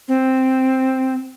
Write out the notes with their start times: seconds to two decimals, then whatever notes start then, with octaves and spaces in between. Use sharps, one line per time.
0.08 C4